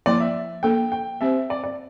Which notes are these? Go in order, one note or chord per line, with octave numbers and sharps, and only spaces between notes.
F3 A#3 E4 D5
E5
A#3 D4 A4 G5
G5
C4 G4 C5 E5
D5
D5